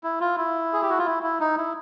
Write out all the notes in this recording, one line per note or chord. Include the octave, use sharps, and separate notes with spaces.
E4
F4
E4
G#4
G4
F#4
F4
E4
E4
D#4
E4